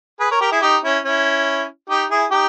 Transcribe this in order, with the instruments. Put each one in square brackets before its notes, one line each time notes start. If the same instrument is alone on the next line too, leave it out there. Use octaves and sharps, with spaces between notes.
[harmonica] G#4 B4
A#4 C#5
G4 A#4
E4 G#4
D#4 G4
C#4 E4
C#4 E4
D#4 G4
E4 G#4
D#4 G4